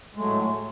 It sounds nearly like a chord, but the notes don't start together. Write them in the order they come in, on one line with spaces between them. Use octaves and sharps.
G#3 A3 F#3 A2